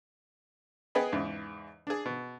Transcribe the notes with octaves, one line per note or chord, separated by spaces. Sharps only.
B3 G#4 D#5 G5 B5
E2 G#2 C#3
D4 G#4
B2